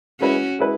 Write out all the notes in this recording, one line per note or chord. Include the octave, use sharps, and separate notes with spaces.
G#3 C#4 E4 F#4 B4
G#3 E4 B4